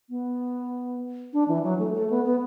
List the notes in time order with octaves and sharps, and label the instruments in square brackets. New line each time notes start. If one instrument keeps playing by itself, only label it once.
[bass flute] B3
D4
E3
F#3
A3
A3
B3
B3